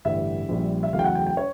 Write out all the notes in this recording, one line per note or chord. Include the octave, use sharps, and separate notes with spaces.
A1 G2 D3 G3 E5
A#1 A#2 G3
E5
E2 C#3 F#3 A3 F5
G5
F#5
G5
G5
C#5